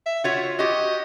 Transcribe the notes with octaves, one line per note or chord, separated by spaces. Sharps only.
E5
F4 F#4 C#5 E5
F#4 G4 D#5